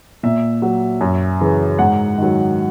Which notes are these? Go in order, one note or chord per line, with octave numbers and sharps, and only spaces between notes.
A#2 E5
F#3
F#2
C#3 E3
G#2 F#5
D#3 F#3